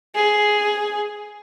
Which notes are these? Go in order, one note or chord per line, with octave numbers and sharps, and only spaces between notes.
G#4